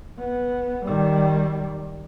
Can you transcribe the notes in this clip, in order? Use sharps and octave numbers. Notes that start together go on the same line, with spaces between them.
B3
D#3 G3